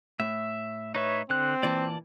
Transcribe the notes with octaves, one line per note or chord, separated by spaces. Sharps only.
A2 E5
D#4 B4 C#5 E5
D3 C4 F#6
A#2 E3 D5 A5